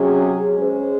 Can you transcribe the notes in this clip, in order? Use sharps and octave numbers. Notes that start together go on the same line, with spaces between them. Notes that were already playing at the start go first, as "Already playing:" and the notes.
Already playing: C3 F#3 C#4 G#4
G#3 C#4 G#4 C5